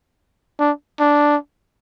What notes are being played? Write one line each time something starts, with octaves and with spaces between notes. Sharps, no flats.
D4
D4